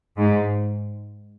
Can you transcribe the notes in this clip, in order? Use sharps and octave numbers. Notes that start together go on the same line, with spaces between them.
G#2